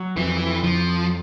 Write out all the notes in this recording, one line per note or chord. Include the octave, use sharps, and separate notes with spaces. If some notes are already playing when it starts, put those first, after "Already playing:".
Already playing: F#3
F2 E3
F2 F3